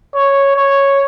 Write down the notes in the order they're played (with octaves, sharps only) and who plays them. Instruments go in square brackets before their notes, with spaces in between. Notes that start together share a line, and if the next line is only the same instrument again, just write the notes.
[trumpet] C#5
C#5